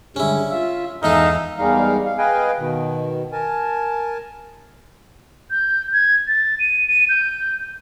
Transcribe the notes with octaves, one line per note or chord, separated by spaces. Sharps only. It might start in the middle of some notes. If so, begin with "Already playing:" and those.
D3 G3 G#3 C#4 E4
F4 E5
E2 G#3 D#4 A4 E5 F5
E2 G3 G#3 D#4 A#4 F5
F5
G#4 B4 D#5 F5 G5 G#5
B2 D#3
A#4 G#5 A5
G6
G#6
A6
D#7
D#7
G6